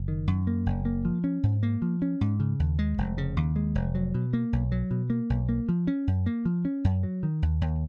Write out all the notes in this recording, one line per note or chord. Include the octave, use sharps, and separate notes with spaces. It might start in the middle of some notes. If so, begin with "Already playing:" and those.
Already playing: F#1
D#3
F#2
A#3
F#1
A#3
F3
C#4
G#2
A#3
F3
C#4
G#2
C#3
D#2
G#3
F1
C#3
D#2
G#3
F1
F#3
B2
A#3
B1
F#3
B2
A#3
B1
A#3
F3
C#4
F#2
A#3
F3
C#4
F#2
F#3
D#3
D#2
D#2